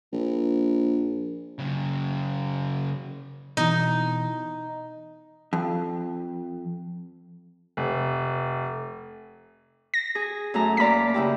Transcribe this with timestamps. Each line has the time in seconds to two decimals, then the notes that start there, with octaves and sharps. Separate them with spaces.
0.12 A#1
1.59 C#3 F#3
3.57 B2 E3 D#4
5.53 F2
7.77 F1
9.94 A#6
10.15 G#4
10.54 F#2 A3 A#5
10.77 A#3 D5 A#5 B6
11.14 C#3 E4 G4